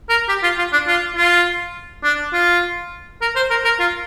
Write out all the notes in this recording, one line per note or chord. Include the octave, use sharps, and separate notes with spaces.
A#4
G4
F4
F4
D4
F4
F4
D4
F4
A#4
C5
A#4
A#4
F4